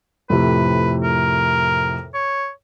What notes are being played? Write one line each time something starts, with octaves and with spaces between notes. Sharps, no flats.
F2 A2 C3 B4
A#4
C#5